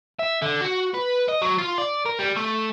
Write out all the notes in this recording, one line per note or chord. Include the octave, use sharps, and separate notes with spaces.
E5
D3
F#4
B4
D#5
F#3
F4
D5
A#4
G3
A3